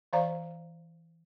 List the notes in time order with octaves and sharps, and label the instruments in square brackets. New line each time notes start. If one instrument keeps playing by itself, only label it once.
[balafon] E3 C5 D5 F5 A#5